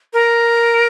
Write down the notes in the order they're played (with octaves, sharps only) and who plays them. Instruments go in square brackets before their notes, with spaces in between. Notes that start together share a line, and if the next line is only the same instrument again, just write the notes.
[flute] A#4